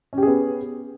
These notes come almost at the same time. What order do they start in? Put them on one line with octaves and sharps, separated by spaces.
C#4 G4 G#4 B3